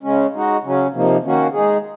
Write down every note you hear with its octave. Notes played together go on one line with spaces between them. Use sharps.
C#3 G#3 C#4
G#3 D#4 F#4
C#3 F#3 C#4
C3 F3 A#3 D#4
D#3 A#3 C#4 F#4
G#3 D#4 G#4